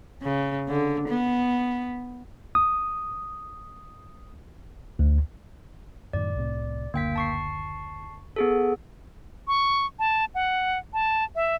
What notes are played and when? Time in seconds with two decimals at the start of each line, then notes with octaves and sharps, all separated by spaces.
0.22 C#3
0.68 D3
1.09 B3
2.55 D#6
4.99 D2
6.13 F#2 A2 D#3 D5
6.35 C2 A2 C3
6.94 F#1 D2 D3 A#3 G5 B6
7.16 A5 C#6 C7
8.36 B3 G#4 A4
9.48 C#6
9.99 A5
10.35 F#5
10.93 A5
11.35 E5